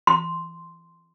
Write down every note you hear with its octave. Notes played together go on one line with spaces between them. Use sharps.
C6